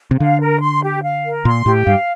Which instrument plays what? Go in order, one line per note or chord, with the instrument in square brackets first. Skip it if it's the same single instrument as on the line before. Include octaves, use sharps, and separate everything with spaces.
[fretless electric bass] C3
[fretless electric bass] D3 [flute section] F5
[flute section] A#4
C6
G4
F5
A#4
[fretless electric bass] A#2 [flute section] C6
[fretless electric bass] A2 [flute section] G4
[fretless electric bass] G2 [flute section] F5